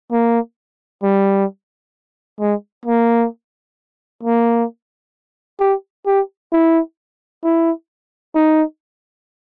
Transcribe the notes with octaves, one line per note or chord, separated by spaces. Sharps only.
A#3
G3
G#3
A#3
A#3
G4
G4
E4
E4
D#4